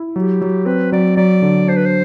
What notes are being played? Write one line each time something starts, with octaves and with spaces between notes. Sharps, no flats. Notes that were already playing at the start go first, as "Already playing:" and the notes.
Already playing: E4
F#3 G4
F#3
C4 B4
F#3 D5
F#3 D5
D3
D4 C5
B4
C5